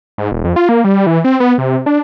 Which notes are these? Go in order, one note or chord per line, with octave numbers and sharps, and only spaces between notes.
G#2
E1
F2
F4
A#3
G3
E3
C4
B3
C3
D4